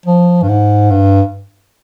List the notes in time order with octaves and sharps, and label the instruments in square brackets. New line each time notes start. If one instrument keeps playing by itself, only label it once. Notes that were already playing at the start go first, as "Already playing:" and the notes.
[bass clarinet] F3
G2
G#2
G2